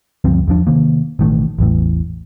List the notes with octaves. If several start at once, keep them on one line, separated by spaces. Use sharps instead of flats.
D2 G2 F3 C4
E2 F3 D4
C3 D#3 A#3
A1 B2 D#3 A3
A1 E2 A2